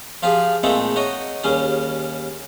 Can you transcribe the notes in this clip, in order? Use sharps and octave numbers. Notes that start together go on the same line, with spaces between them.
F3 F4 G4 G#4
A#2 G#3 A3 C4 D#4 A4
D#4 F#4 C#5 D#5
D#2 G3 C#4 G#4